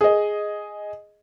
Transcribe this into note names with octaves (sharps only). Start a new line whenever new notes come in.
G#4 D#5